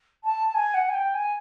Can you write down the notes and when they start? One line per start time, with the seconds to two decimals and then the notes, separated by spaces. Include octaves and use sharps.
0.24 A5
0.46 A5
0.54 G#5
0.74 F#5
0.88 G#5
0.93 G5
1.14 G#5